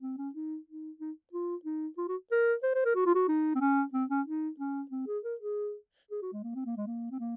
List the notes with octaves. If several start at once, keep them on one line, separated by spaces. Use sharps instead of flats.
C4
C#4
D#4
D#4
D#4
F4
D#4
F4
F#4
A#4
C5
C5
A#4
F#4
F4
F#4
D#4
C4
C#4
C4
C#4
D#4
C#4
C4
G#4
A#4
G#4
G#4
F#4
G#3
A#3
C4
A#3
G#3
A#3
C4
A#3